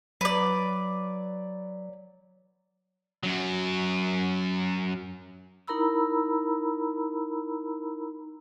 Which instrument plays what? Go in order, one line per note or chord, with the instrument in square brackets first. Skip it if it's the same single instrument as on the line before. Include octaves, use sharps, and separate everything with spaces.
[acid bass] F#3 [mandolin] B4 D5
[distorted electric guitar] F#2 F#3
[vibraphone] D#4 E4 A#4 A#5 B5 E6